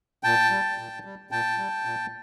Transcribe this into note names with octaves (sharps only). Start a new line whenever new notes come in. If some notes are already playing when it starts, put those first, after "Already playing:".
A#2 G5 A5
G3
A#2
G3
A#2 G5 A5
G3
A#2